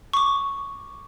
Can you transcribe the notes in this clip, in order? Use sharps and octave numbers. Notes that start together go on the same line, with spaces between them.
C#6 D6